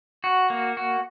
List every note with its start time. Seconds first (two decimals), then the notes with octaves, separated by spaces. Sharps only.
0.24 F#4
0.50 A#3
0.77 F#4